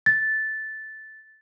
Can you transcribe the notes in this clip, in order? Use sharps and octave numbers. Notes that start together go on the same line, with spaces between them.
A6